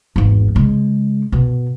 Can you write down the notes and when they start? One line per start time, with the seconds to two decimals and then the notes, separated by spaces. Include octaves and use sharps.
0.16 G#1 E2
0.55 C#3 G#3
1.32 B2